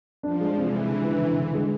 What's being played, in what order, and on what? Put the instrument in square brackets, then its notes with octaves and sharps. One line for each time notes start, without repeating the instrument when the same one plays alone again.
[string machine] F3 [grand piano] D4
[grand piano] G#3
[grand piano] C3 [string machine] E3
[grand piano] G#3
D3
D3
D3
D3
G#3